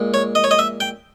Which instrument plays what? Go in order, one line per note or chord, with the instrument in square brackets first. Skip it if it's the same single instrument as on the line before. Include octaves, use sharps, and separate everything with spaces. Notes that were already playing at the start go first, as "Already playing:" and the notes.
Already playing: [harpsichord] A#2 G#3
C#5
D#5
C#5
D#5
E5
G5